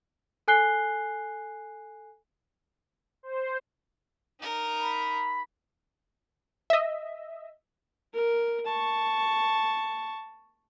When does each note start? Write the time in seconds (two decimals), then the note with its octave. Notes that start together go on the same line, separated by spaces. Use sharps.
0.48 A4 G#5 F#6 C7 G7
3.23 C5
4.40 D#4 A#4
4.80 B5
6.70 D#5 E5
8.14 A#4
8.66 A5 C#6